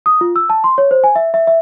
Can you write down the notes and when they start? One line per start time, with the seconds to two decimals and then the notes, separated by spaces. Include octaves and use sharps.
0.06 D#6
0.21 F4
0.36 E6
0.50 A5
0.64 C6
0.78 C#5
0.91 C5
1.04 G#5
1.16 E5
1.34 E5
1.47 E5